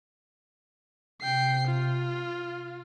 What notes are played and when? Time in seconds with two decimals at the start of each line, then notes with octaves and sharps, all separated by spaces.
1.21 C3 G5 C7
1.67 F4